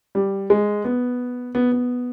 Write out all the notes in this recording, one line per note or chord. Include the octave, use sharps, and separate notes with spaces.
G3
G#3
B3
B3
B3